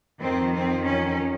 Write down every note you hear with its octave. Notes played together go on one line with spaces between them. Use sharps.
F2 D#3 C4
C4
C#4